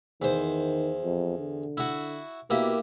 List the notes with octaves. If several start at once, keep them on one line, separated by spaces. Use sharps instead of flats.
E2 D#3 C5
F2
D3
E4 F#4
B2 A#3 E4 G4